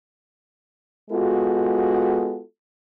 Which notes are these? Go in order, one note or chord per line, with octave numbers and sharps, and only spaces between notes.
G#3 B3 F4 F#4 A4